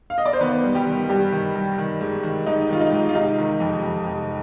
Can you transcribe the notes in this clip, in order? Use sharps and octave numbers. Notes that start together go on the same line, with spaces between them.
F5
D#5
D5
C5
D#3 B3 B4
G2
G3 G4
D#3
G2 G3 G4
D#3
G2
D#3
G#2
D#3
G#2 D#4
D#3 F4
D#4
G#2
F4
C3 D#4
D#3
F2
F2
C3